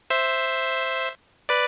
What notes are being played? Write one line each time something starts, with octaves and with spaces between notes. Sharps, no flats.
C5 E5
B4 D5